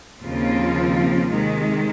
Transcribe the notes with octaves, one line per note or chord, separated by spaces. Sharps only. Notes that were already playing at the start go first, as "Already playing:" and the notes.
D#2 C#3 F3 C4 F4
C3 D#3 G#3